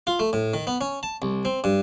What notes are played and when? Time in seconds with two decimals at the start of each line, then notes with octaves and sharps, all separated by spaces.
0.07 F4
0.19 A3
0.33 A2
0.54 D#3
0.67 B3
0.81 C#4
1.03 A5
1.22 C2
1.45 C4
1.64 G2